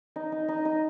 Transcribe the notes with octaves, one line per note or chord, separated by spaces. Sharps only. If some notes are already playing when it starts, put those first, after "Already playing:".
D#4
D#4
D#4
D#4